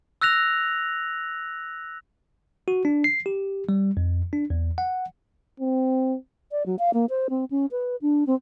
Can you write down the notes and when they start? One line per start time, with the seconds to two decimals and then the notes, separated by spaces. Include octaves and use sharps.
0.21 E6 F#6 A#6 F7
2.68 F#4
2.85 D4
3.04 C7
3.26 G4
3.69 G3
3.97 F2
4.33 D4
4.50 E2
4.78 F#5
5.60 C4
6.51 D5
6.66 F#3
6.79 F5
6.94 A#3
7.10 C5
7.30 C4
7.51 C#4
7.71 B4
8.02 D4
8.27 C4